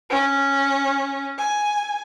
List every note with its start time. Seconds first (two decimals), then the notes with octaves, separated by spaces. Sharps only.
0.10 C#4
1.38 G#5